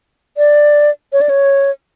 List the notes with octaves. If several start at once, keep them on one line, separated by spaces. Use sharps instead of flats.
D5
C#5
D5
C#5